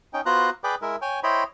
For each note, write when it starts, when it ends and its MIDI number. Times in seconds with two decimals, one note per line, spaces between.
0.13 0.21 61
0.13 0.21 63
0.13 0.21 79
0.26 0.50 59
0.26 0.50 65
0.26 0.50 66
0.26 0.50 72
0.26 0.50 82
0.26 0.50 90
0.64 0.75 68
0.64 0.75 71
0.64 0.75 74
0.64 0.75 79
0.64 0.75 86
0.82 0.96 56
0.82 0.96 64
0.82 0.96 70
0.82 0.96 76
1.02 1.20 73
1.02 1.20 79
1.02 1.20 80
1.23 1.44 64
1.23 1.44 72
1.23 1.44 73
1.23 1.44 75
1.23 1.44 79
1.23 1.44 83